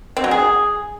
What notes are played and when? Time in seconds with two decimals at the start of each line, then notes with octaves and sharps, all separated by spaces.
0.17 C4
0.24 F#3
0.31 G#4